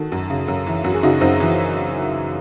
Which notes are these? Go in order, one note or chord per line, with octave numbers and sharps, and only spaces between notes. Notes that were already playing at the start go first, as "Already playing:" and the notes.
Already playing: D#3 F#4 A4
F#2
C#3
F#2
E3
F#2 F#4
G#4
C#3 D#4 F#4
F#2 C4 D#4
E3